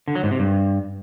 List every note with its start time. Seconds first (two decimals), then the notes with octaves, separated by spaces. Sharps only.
0.08 D3
0.15 F#3
0.23 G#2
0.31 C3
0.39 G2